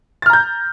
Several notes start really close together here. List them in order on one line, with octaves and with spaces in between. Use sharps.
A6 F6 A#5 G6